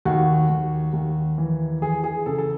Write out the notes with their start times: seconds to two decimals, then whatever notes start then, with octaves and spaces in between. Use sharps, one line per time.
0.05 D#2 F#4
0.49 D#2
0.93 D#2
1.38 E3
1.81 E3 G#4
2.04 G#4
2.26 C#3 A4
2.38 A4